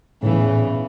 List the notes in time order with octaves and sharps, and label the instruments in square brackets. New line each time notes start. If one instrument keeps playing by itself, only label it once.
[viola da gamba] E2 C#3 E3 [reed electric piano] A2